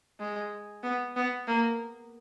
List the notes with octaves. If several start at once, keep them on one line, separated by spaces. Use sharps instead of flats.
G#3
B3
B3
A#3